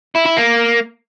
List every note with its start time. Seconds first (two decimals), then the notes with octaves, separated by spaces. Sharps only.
0.16 E4
0.27 E4
0.37 A#3